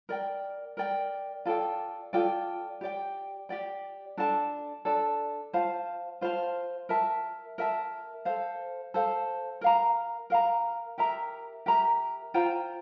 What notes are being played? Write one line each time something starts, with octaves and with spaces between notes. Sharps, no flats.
A#4 D5 G5
A#4 D5 G5
F4 A4 D5 G5
F4 A4 D5 G5
G4 D5 G5
G4 D5 G5
D4 A4 D5 A5
D4 A4 D5 A5
F4 C5 F5 A5
F4 C5 F5 A5
A#4 E5 A5
A#4 E5 A5
A4 C5 F5
A4 C5 F5
A#4 F5 A#5
A#4 F5 A#5
G4 A#4 E5 A#5
G4 A#4 E5 A#5
F4 C5 G5 A#5